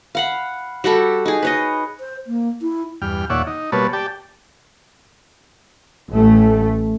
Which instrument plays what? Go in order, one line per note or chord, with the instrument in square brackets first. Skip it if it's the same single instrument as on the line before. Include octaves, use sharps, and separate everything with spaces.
[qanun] F5 F#5 B5
G3 F#4 G4 A4
D#4 G#4
B4 C#5 D#5
[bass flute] C5
A#3
E4
[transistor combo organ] E2 G2 G5 F6
D#2 A#2 C#5 D5 E5 F#5
D#4
B2 G3 A#3 B4 C#5 A5
G4 D5 G5 A5
[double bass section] A1 A3